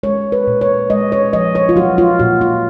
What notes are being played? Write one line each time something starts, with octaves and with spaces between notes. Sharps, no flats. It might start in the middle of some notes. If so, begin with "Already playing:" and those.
G#3 C#5
B4
A#2
C#5
G#3 D#5
C#5
F3 D#5
C#5
F4
F#3 F#4
F4
A#2 F#4
F4